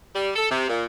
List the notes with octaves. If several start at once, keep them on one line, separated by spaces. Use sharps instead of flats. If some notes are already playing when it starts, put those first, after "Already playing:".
G3
A4
C3
A#2